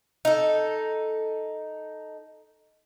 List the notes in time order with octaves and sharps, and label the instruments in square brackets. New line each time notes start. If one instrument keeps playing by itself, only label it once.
[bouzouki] D#4 A4